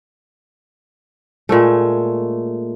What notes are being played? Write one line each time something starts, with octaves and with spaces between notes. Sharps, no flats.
A#2 G#3 A3